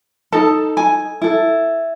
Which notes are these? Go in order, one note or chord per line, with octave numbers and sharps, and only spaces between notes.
D#4 A4 A5
G#5
E4 A4